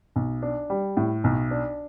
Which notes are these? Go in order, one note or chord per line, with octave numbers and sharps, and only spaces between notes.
B1
D4
G3
A2
B1
D4